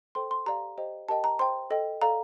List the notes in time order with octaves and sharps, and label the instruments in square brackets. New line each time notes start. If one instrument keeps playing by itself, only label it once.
[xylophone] A4 C5 G5 C6
C6
G4 D5 F5 A#5
G4 C5 D#5 G5
G4 A#4 D#5 G5 A5
A#5
C5 G5 C6
A4 D#5 G5
A4 D5 F5 A#5